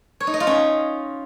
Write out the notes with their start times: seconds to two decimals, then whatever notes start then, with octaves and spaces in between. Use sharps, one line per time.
0.20 C#5
0.27 D#4
0.34 D#5
0.40 F4
0.47 C#4